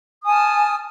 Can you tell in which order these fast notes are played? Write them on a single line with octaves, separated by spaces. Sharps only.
D#6 G#5 A5 F6